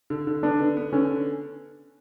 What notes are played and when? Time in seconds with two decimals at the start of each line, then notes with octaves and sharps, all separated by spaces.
0.10 D3
0.27 D3
0.43 B3 D4
0.60 D3
0.77 B3
0.93 D3 C#4